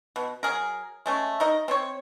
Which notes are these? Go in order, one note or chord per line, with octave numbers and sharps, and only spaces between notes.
B2
F#3 G#4 A#4
G#3 A3 C#4
D#4 A#4 D#5
C4 C5 C#5